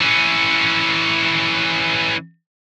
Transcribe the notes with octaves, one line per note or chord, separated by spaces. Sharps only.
E3 C#4